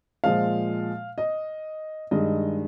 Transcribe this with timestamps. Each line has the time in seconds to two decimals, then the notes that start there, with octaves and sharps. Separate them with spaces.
0.24 A#2 F3 G#3 F5
1.18 D#5
2.11 G2 D#3 G#3 D#5